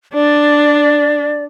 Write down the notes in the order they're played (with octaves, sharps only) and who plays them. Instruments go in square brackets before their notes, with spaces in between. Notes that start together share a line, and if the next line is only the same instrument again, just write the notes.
[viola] D4 [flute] D5